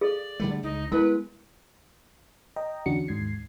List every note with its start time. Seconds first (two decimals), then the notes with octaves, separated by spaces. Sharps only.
0.01 G#4 A4 D5 F5
0.40 D3 G3 A3
0.63 C#2 D#4
0.92 G#3 B3 E4 A#4 B4
2.56 D#5 G5 A#5
2.86 E2 D3 C#4 D4 F#4 C#7
3.08 D#2 G#2 D#3 G#6 C7